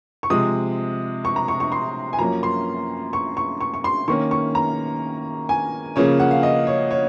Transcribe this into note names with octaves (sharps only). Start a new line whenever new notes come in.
C#6
C3 F3 G#3 D#6
C#6
A#5
C#6
C#6
C6
G#5
F#2 F3 A#3 C#4 A#5
C6
C#6
C#6
C#6
C#6
C6
D#3 A#3 C#4 C#6
C#6
A#5
G#5
C#3 F3 A#3 C#4 C#5
F#5
F5
D#5
C#5
C#5